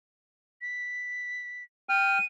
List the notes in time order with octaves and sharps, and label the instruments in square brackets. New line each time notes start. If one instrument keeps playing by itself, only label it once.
[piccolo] B6
[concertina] G5 F6 [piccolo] D#7